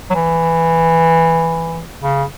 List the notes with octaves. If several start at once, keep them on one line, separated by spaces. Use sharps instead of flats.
F#3
E3
C#3